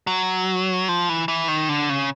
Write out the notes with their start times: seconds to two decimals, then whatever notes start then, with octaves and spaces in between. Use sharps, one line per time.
0.07 F#3
0.89 F3
1.09 E3
1.28 E3
1.48 D#3
1.69 D3
1.89 C#3